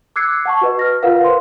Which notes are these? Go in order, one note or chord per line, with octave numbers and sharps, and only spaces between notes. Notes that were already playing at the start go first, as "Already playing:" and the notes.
D6 E6 F#6 G#6 C7 C#7
F#5 A5 C#6
F#4 B4 D#5
F6 A#6
F4 A#4 B4 F5 F#5
C5 C6